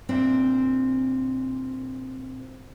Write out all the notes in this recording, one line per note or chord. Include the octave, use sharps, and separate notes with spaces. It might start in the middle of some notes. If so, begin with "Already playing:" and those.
A#2 C4 D4 E5